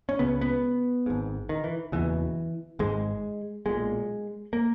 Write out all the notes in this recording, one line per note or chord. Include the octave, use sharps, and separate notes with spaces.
C#4
C#2 C#3 B3
B3
G#1 G#2
D#3
E3
F#1 E2 B2 E3
G#1 G#2 G#3
B1 A#2 G#3
A#3